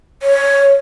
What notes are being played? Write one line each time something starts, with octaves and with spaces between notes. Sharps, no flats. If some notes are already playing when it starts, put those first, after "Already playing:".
C#5